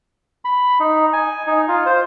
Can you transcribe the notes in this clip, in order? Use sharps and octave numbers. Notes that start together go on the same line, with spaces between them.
B5
D#4
G#5
D#4
F4
C5